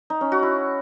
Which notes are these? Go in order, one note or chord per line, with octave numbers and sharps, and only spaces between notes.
D#4
C#4
F#4
E4